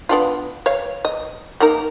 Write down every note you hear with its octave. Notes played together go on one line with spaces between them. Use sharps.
B3 D4 F4
C#5 F5
D#5
A#3 D#4 A#4